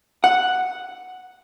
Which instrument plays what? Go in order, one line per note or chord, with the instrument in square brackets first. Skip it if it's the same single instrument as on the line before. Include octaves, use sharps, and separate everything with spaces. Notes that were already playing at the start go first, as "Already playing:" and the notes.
[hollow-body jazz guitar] F#5